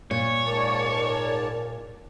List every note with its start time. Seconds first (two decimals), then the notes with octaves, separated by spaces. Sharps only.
0.11 A#2 C#5
0.46 G#2 A#4 D5 A5